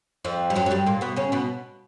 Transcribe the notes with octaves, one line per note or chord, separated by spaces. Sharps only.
F2 F3
G3
F#2 F#3
F#3
G2 G3
A#2 A#3
B2 B3
C#3 C#4
B2 B3